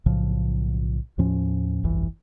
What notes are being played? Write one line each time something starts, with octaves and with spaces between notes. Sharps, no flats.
B1 A2 C#3 F3
D#2 A2 F3 C#4
G1 C2 F2 E3